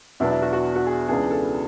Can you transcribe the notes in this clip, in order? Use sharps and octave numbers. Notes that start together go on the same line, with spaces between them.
E2 B2 F#3 B3 D4 E4
E4
F#4
F#4
F#4
G#4
C#2 C#3 E3 B3 D4 G#4
A4